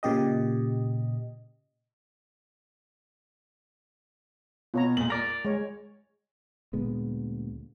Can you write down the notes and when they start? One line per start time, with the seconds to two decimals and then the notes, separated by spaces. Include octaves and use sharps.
0.03 A#2 C#3 G4 D#5
4.74 B2 F4 C#5 A#5
4.97 A#2 G#3 F#7
5.10 A#4 D5 A#6
5.45 G#3 C#5
6.73 D2 A#2 G#3 B3